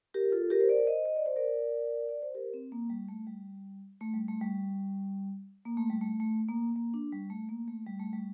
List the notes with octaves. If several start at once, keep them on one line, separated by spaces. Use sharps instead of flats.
G4 A#4
F4 A4
G4 A#4
C5
A#4 D5
C5 D#5
D#5
D5
C5
A#4 D5
D5
C5
G4 A#4
C4
A#3
G3
A3
G3
A3
G3
A3
G3
A#3
A3
G3
A3
A3
A#3
A#3
D4
G3
A3
A#3
A3
G3
A3
G3